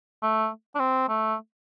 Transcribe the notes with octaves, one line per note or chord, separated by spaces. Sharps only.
A3
D4
C4
A3